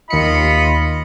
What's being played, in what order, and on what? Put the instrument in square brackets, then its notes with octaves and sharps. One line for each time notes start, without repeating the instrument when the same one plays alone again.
[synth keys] D#2 C#7 [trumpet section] F4 D#5 B5